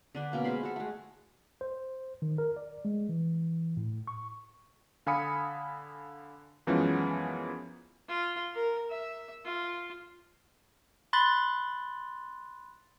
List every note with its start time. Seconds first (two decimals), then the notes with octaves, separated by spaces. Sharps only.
0.15 D3 D4 B4
0.32 B2 A#3 C#4
0.44 G#3 C5 F5 B5
0.63 F#4 A4
0.76 G#3 A3
1.61 C5
2.22 D#3
2.38 A#4
2.57 D5
2.85 G#3
3.09 E3
3.77 A2
4.07 C#6
5.07 D3 F5 G#5 B5 D#6 C#7
6.67 F#2 E3 F3 G#3 B3 C#4
8.08 F4
8.55 A#4
8.90 E5
9.45 F4
11.13 B5 C6 F#6 A6